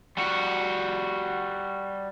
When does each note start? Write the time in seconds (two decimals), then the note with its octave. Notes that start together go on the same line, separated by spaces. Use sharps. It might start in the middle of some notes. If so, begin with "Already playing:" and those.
0.17 G3 F#4